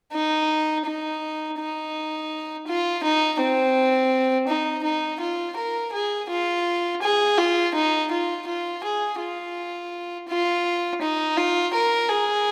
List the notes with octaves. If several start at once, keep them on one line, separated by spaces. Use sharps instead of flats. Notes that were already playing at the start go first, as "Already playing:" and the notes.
D#4
D#4
D#4
F4
D#4
C4
D#4
D#4
F4
A#4
G#4
F4
G#4
F4
D#4
F4
F4
G#4
F4
F4
D#4
F4
A#4
G#4